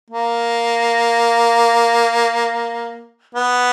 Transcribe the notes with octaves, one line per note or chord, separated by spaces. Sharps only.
A#3
B3